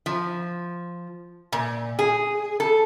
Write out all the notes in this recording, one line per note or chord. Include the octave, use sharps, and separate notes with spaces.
F3
A#2
G#4
A4